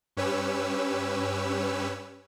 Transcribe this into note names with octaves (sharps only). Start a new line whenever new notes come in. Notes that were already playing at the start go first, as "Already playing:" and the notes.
G2 C#4 G4 B4 C#5 E6